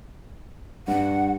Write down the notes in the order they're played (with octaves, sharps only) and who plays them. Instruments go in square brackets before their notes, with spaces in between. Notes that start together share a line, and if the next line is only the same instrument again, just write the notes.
[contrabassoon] G2 [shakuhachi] F#5